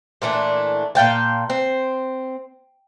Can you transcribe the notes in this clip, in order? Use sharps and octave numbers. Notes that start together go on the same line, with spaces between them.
A#2 E3 A3 D4
A#2 F5 G5 A5
C4